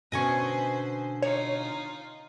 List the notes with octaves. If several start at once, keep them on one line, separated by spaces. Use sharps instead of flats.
B2 D3 C#4 B4 C5 D#5 G#5 C#6
D#4 F4 C#5